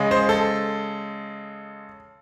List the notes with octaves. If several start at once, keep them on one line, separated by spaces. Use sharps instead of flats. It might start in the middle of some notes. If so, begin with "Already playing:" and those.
Already playing: C#3 G#3
C5
A4